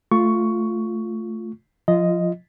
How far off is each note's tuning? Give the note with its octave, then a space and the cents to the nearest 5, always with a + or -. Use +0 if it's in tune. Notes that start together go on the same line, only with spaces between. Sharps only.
A3 +0 F4 +0 C#6 +10
F3 +20 F4 -25 D#5 +0